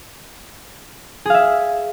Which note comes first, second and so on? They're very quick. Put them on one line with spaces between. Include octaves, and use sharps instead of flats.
G#4 F5 E5